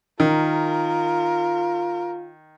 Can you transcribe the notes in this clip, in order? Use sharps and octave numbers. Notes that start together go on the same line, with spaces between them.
D#3 F4 A#4